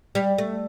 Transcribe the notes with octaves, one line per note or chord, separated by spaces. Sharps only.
G3
A3